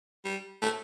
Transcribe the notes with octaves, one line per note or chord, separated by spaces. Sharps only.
G3
A3